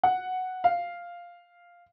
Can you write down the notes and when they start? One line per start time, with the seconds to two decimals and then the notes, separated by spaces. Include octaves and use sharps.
0.03 F#5
0.64 F5